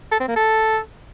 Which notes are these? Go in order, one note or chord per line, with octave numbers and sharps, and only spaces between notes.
A4
C4
A#3
A4